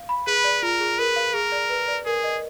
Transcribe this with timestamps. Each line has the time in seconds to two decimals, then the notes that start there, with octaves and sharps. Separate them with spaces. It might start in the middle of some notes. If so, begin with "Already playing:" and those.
Already playing: F5
0.09 B5
0.27 G#4 B4
0.44 D5
0.63 F4 A#4
0.80 G#4
0.99 A#4 B4
1.16 F5
1.34 G#4 A#4
1.52 D5
1.70 B4
1.88 D5
2.06 G#4 A#4
2.24 D#5